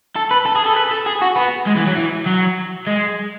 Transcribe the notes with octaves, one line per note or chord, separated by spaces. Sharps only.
A4
B4
A4
G#4
A4
B4
A4
G#4
F#4
B3
G#3
E3
F#3
E3
F#3
G#3